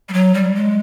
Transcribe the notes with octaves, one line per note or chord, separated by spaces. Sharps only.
G3
F#3
G3
G#3